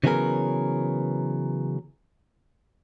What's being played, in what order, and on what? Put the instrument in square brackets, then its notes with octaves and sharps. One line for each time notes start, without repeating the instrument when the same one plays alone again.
[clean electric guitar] C#3 E3 F#3 B3 G#4 A#4